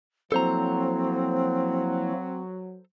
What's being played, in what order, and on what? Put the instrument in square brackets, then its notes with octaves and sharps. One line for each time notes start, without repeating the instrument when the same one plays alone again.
[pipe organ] F3 A#3 E4 [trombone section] F#3 [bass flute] C4 [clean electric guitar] A4 C5 A#5